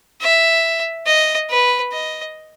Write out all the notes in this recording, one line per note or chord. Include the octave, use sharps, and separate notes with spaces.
E5
D#5
B4
D#5